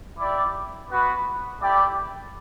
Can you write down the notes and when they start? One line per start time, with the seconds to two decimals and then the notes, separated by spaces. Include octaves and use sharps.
0.19 E4 G4 D5
0.89 B3 F#4 B4
1.60 A3 E4 G4 D5 G5